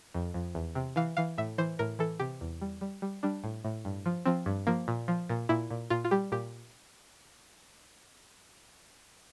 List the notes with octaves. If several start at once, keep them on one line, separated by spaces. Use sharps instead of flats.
F2
F2
E2
C3
E3 F5
E3 F5
A2 E5
E3 C5
A2 A#4
E3 A4
C3 G4
E2
G3
G3
G3
G3 D4
A2
A2
G2
F3
F3 C4
G2
F3 A#3
A#2
F3
A#2
A#2 E4
A#2
A#2 F4
F4
G3 G4
A#2 G4